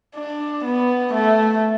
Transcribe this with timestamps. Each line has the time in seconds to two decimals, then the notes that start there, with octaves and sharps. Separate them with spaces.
0.16 D4
0.65 B3
1.14 A3